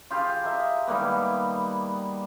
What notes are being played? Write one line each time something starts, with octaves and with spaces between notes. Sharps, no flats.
F4 G4 G#4 B5
D#5 E5 A#5
D#3 G3 A#3 B3